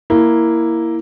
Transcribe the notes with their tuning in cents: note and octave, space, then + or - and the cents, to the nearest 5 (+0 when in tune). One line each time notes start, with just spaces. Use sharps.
A#3 +0 E4 +0